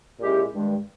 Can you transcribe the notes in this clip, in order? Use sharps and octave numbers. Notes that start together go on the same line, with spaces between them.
A#2 G#3 C#4 E4 G4
G2 D#3 G#3